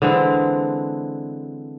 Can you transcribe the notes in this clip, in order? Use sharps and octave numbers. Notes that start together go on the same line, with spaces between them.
D3 E3 G#3 C4